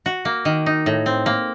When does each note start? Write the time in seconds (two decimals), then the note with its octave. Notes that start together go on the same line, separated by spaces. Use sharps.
0.06 F#4
0.25 A#3
0.45 D#3
0.66 D#4
0.86 A2
1.06 C4
1.26 A#3